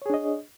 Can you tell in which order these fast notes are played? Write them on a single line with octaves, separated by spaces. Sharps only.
C#5 G#4 D4 D#5